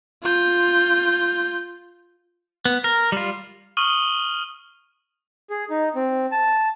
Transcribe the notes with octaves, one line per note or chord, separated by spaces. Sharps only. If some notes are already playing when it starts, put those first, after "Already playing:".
F4 G6
B3
A#4
G3 F4
C#6 D#6 F6 D#7 F#7 G7
G#4
D#4
C4
A5